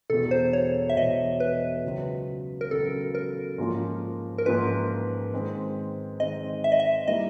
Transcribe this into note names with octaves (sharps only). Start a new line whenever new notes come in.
E1 E2 B2 A4
C5
C#5
E5
E1 E2 B2 D#5
B4
C#2 C#3 F#3
A#4
C#2 C#3 F#3 A4
A#4
G#2 F3 A#3 C#4 F4
A#4
G#2 F3 A#3 C#4 F4 B4
D#3 G#3 C4
D#3 G#3 C4 D#5
E5
D#5
E5
E3 G3 A#3 D#4 D#5